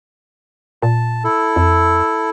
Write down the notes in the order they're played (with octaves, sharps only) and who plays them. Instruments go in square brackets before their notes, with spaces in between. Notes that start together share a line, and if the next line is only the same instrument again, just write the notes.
[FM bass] A#2 [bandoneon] A5
[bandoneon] E4 A4
[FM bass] F2